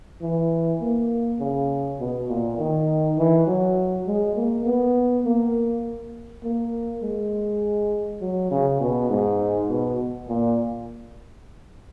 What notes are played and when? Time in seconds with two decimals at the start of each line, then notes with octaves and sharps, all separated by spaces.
0.22 E3
0.81 A#3
1.40 C#3
1.99 B2
2.29 A#2
2.58 D#3
3.17 E3
3.47 F#3
4.06 G#3
4.36 A#3
4.66 B3
5.24 A#3
6.43 A#3
7.03 G#3
8.21 F#3
8.51 C#3
8.80 B2
9.10 G#2
9.69 B2
10.28 A#2